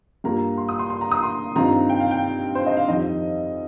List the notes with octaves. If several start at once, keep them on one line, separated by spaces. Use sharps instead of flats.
G2 G3 A#3 F4 A#5
C6
D#6
C6
C6
A#5
D#6
C6
G2 D#3 C4 F4 A#5
G5
F5
G5
C5
D#5
F5
F2 D#3 G3 D#4 D#5